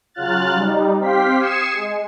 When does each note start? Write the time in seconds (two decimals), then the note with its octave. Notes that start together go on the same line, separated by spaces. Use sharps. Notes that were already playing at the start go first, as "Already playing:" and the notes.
0.14 C#3 F#3 F4 F6 F#6 A6
0.54 G3 D#4
0.98 C4 G4 F5 G5 C6 B6
1.39 D#6 G#6 C7 C#7 E7
1.73 G#3